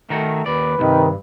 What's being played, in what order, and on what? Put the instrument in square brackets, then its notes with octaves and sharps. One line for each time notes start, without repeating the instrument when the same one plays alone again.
[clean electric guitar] D#3 D#4 F#4 [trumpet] A3
[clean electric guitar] D#2 D5 [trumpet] B4
[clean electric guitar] C2 G2 [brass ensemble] C3 D#3